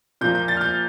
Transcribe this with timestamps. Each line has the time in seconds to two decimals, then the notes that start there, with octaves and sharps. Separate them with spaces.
0.21 A#2 F3 A#3 G6
0.35 G6
0.48 A6
0.57 F6
0.61 G6